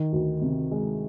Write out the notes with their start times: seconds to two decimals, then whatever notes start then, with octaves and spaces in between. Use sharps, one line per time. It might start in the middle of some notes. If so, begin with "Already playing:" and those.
Already playing: D#3
0.12 D2
0.41 C3
0.71 G#3